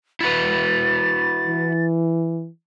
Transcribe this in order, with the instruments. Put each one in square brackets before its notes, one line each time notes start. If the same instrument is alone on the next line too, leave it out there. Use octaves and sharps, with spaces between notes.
[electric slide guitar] E4 F#4 B4 [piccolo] A6
[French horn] E3